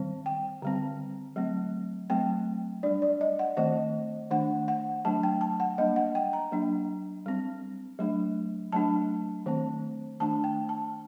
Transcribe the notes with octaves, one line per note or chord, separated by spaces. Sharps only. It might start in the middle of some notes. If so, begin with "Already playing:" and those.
Already playing: D#3 G3 C4
G5
D3 G3 C4
F#3 A3 C4
F#3 A3 C4 G5
G3 D4 D5
D5
D#5
F#5
D#3 A3 C4 D#5
D#3 A3 D4 F#5
F#5
F#3 A3 D4 A5
G5
A5
F#5
G3 A#3 D4 D#5
F#5
G5
A#5
F#3 A#3 D4
G3 C4
F#3 A3 D4
F#3 A3 D4 A5
D#3 A3 C4
D#3 A3 D4 A5
G5
A5